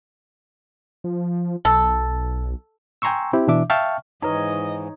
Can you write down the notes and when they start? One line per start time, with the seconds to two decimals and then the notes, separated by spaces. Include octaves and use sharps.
1.04 F3
1.65 B1 A4
3.02 G5 G#5 A#5 C6 C#6 E6
3.33 C4 E4 G4
3.48 B2 E3 D4 E5 D6
3.70 E5 F5 G5 A5 C#6 F6
4.22 G#2 E3 D#4 B4 C#5 D#5 A#5